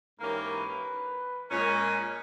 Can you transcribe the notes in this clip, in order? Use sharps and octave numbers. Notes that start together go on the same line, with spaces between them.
G#2 E3 A#3 C#4 G4 A#4
B4
A#2 G#3 C#4 A#4